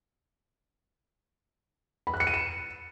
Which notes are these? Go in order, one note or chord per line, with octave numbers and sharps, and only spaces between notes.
B5
F#6
C#7
D#7
E7